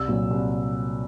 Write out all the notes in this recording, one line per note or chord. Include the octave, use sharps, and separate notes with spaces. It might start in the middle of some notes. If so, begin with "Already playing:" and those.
Already playing: C2 E6
A#2 F#3
C2